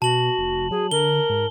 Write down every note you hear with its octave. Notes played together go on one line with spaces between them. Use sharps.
B2 F#4 A5 F#7
F1
F#3 G#4
D3 A#4 G7
G#2